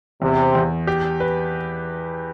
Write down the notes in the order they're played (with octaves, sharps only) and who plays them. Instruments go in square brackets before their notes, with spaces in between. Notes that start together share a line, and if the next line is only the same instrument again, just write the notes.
[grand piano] E2 [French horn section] C3
[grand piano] E2
G4
B4